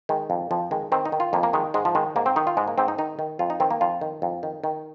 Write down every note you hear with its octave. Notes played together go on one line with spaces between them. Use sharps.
D#3 G#3
F2
F2 F3
D#3 G#3
D#3 C4
D#4
D#3
F4
F2 A#3
A#3
D#3 G#3
G#2 G#3
F3
D#3 G#3
G#2 A#3
C4
D#3 D#4
F4
G#2 G#3
A#3
G#2 C4
D#4
D#3 D#4
D#3
F2 F4
D#4
D#3 C4
A#3
F2 F4
D#3
F2
D#3
D#3